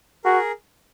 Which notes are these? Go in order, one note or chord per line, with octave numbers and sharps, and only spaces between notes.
F#4 G#4 A#4